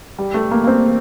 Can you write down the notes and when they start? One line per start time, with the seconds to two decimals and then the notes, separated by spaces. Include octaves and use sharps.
0.19 G3
0.34 A3
0.51 A#3
0.64 A#3
0.67 C4